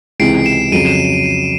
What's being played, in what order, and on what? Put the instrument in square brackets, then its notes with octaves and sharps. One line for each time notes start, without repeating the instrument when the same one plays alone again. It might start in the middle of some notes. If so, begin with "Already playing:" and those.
[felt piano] C#2 C3 E3 G#3 C4 [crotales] C7 D7
[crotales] D7 E7
[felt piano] F2 C#3 F#3 [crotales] D#7
[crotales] E7